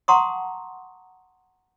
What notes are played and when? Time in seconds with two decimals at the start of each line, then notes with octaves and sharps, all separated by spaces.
0.08 F#5 A5 A#5 C6 C#6 D#6